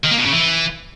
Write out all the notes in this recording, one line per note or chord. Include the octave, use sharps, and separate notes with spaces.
D#3
A#3
B2
C#3
E3